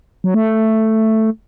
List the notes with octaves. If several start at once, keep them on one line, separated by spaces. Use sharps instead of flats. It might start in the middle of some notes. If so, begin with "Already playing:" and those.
F#3
A3